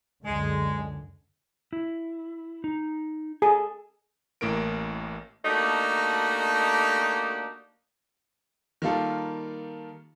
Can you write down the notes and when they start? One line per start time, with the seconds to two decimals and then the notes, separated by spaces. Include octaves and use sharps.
0.24 C#2 F#2 D3 G#3
1.73 E4
2.64 D#4
3.42 G#4 A4 G#5
4.41 A1 A2 A#3 A#4 D7
5.45 A3 A#3 D4 D#4 F#4 G4
8.82 D#3 G3 A#3 F4 A4